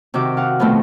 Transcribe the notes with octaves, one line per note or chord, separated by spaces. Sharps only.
C3 D#3 F#4 D6
F5 F#5
B2 D#3 F3 A3 B3 C4